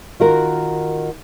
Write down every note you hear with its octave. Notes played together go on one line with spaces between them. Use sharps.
D#3 F4 F#4 A#4